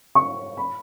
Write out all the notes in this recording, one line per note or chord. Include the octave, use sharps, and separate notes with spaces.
C#6
B5